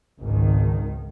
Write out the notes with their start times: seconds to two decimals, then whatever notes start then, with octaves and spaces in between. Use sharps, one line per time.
0.20 G#1 C#2 D#3